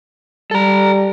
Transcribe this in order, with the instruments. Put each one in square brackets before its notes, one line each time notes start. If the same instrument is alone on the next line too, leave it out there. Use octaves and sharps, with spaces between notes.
[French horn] G3 [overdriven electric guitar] A4 A#5